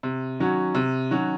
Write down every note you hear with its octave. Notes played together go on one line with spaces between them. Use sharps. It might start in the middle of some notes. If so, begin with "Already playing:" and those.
C3
D#3 F#3 C#4 F#4
C3
D#3 F#3 C#4 F#4